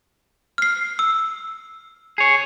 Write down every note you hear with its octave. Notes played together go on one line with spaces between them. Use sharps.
F6 C7
E6
G#4 C#5